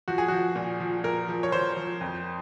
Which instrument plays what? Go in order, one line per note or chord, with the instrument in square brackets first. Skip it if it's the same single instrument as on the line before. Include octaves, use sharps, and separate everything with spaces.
[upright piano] F3 F#4
G#4
F3 F#4
A#2
F3
A#2 A#4
F3
C#5
F3 C5
F3
F2